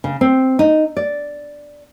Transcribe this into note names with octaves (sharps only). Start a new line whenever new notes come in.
C#3
C4
D#4
D5